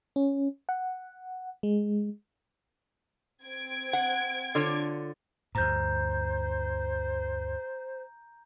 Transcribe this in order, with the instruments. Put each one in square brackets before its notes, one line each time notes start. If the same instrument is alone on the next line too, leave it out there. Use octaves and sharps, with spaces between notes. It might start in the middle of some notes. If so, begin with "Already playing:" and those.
[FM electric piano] C#4
F#5
G#3
[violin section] C4 G#6 D7
[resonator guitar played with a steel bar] F#5
D3 F4 C#5
[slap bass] D2 G2 [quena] C5 [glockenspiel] A#5 G6